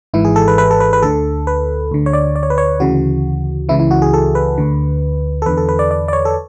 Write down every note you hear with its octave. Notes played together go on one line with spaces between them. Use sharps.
G#1 G#2 E3 E4
G#4
A4
B4
B4
A4
B4
B4
D2 D3 A4
B4
D2 D3
C#5
D5
D5
C#5
B4
C#5
D2 C#3 E3 F#4
C#2 C#3 E3 E4
E4
F#4
G#4
A4
B4
D2 D3
A4
E2 D3 B4
A4
B4
D5
D5
D5
C#5
A4